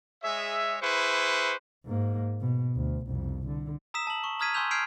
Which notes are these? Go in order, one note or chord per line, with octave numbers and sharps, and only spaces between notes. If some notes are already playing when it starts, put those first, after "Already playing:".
G#3 G#4 C#5 E5
E4 G#4 B4 C5 C#6
G#2 A#3
B2
D2
C2 F2
D3
A#5 D#6 E6 B6 E7
A5 F#7
C#6
A#5 D#6 F6 G#6 B6 D#7
G#5 C6 C#6 E6 G6 F7
F6 G6 G#6 C7 D7 F7